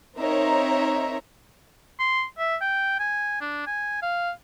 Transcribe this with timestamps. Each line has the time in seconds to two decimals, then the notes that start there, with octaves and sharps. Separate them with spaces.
0.18 C4 D#4 A#4 C#5 E5 A#5
1.99 C6
2.38 E5
2.61 G5
3.00 G#5
3.41 D4
3.67 G#5
4.02 F5